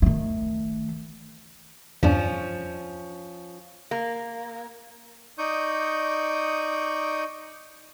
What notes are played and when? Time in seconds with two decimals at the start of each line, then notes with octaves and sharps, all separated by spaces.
0.02 D#3 A3
2.03 E2 G2 F3 C#4 D4
3.91 A#3
5.38 D#4 D5 C#6 D#6 G6